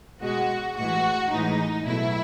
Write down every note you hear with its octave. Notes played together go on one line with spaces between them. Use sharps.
B2 G#3 F#4
A2 E3 G#3 F#4
A2 E3 G#3 D#4
B2 F#3 A3 E4